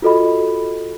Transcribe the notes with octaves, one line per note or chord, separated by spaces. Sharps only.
F4 F#4 A4 D#5 B5